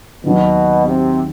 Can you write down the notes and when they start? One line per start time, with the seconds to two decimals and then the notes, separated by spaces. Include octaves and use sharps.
0.23 D#2 B2 D#3 F#3
0.86 C3